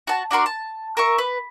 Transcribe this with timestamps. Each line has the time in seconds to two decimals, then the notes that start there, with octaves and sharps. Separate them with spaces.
0.07 F#4 A5
0.31 D4 F#4 A#4 C6
0.46 A5
0.97 A#4 E5 C#6
1.18 B4